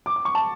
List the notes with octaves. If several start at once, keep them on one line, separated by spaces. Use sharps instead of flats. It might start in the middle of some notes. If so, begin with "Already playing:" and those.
D6
D6
C#6
A5